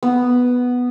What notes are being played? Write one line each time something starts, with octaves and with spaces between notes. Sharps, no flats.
B3